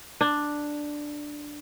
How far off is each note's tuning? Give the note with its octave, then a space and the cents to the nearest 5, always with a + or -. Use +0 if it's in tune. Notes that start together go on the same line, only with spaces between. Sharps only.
D4 +5